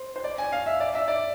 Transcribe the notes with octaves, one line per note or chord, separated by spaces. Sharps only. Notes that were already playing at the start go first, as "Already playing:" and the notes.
Already playing: C5
C5
D5
G#5
F5
E5
D5
E5
D5